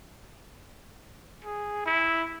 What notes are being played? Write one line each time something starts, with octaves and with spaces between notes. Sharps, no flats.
G#4
E4